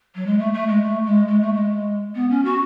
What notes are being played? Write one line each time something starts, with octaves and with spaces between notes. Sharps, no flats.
F#3
G#3
A3
A3
G#3
A3
G#3
G#3
A3
G#3
B3
C#4
F#4